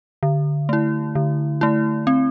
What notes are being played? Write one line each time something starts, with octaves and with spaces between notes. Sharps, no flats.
D3
A3 E4
D3
A3 E4
C4